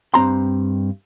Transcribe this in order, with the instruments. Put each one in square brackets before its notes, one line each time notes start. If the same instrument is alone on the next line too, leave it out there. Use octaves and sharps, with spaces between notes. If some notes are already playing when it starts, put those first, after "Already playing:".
[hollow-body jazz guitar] G2 C4 A#5 C6